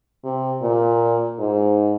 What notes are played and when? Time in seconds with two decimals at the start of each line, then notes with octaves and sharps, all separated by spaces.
0.24 C3
0.62 A#2
1.39 G#2